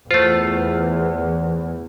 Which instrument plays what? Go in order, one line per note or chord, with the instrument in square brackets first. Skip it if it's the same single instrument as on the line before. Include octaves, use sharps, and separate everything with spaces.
[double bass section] E2 [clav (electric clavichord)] A3 F4 [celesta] C5